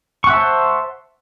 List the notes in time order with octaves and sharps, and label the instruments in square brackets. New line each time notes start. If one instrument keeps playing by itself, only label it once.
[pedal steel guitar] C#6
F#5
E5
A5
C5